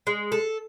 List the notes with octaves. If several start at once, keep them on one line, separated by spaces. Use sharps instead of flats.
G#3
A4